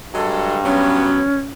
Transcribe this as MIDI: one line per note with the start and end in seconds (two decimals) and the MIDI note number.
0.13 1.14 43
0.13 0.57 54
0.13 0.57 56
0.13 0.57 69
0.64 1.22 54
0.64 1.22 59
0.64 1.51 61